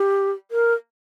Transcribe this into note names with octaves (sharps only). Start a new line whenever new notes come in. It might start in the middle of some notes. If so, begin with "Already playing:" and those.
Already playing: G4
A#4